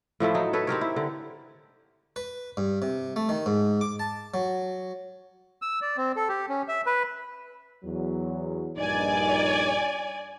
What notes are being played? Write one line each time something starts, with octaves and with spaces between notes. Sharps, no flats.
A2 F3 A3 E4
F#3 D#4
A4 B4 C#5
C4 G4 A#4 C#5
E4
D3
B4
G2
C3
A3
D#3
G#2
D6
A5
F#3
E6
D5
C4
A4
G4
C#4
E5
B4
E2 F#3
A#1 G2 D#4 D5 G#5